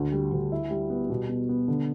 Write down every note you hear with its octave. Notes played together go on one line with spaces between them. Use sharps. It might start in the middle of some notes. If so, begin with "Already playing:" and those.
Already playing: D2 D3
G3
D2
E4
G3
B3
B2
B3
B3
D3